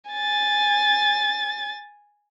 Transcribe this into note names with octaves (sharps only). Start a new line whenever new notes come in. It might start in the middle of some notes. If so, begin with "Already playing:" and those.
G#5 A6